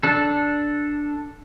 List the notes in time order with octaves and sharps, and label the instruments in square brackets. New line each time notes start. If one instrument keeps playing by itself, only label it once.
[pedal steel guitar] D4 A4